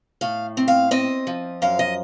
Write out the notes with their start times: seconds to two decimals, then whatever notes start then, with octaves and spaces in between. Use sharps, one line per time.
0.21 A2 F5
0.57 C4
0.68 F5
0.91 C4 D#5
1.27 F3
1.62 F#2 F5
1.79 D#5